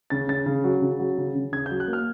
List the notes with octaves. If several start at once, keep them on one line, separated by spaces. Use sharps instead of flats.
C#3 A6
C#3 A6
C#3
F#3
C#3
F#3
C#3
C#3
C#3 G#6
G6
F#3
F#6
A#3
F6